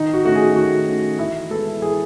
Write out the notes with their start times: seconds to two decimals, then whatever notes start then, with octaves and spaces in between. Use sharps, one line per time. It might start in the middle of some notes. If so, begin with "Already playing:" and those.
Already playing: D#3 D#4
0.13 F#4
0.25 A3 C#4 F#4
0.36 G#4
0.56 D#3 F#4
0.87 A3 C#4
1.19 E3 E4
1.50 G#3 B3 A4
1.82 E3 G#4